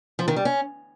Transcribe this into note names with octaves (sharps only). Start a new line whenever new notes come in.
F3
D#3
G3
C#4